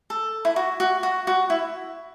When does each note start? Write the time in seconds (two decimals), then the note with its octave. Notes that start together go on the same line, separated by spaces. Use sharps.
0.10 A4
0.45 E4
0.56 F#4
0.80 F#4
1.03 F#4
1.27 F#4
1.50 E4